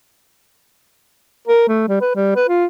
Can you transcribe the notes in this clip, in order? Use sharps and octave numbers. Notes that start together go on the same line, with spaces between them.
A#4
A3
G3
B4
G3
B4
F4